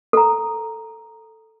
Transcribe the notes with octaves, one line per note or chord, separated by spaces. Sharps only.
A4 A#5